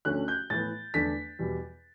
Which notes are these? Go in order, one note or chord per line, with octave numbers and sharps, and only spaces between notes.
D2 D3 A3 C#4 F#6
G6
A2 E3 B3 A6
E2 D3 A3 D4 B6
E2 B2 G3